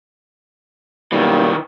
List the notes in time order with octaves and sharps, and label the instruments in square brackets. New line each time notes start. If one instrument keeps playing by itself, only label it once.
[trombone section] B1 G3 A#3 [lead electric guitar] D#3 E3